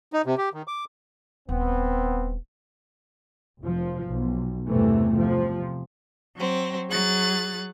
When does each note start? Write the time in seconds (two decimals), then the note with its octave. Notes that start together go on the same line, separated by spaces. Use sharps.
0.13 D#4
0.26 C3
0.38 G4
0.54 D#3
0.68 D6
1.49 D#1 B3 C4
3.60 F1 F3
4.05 B1
4.68 E2 G2 C3 E3 A3
5.14 C3 F3
6.37 F#3 C4
6.91 F#3 G#4 F#6 A6